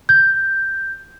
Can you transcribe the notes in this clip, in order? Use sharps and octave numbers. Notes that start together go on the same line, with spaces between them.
G6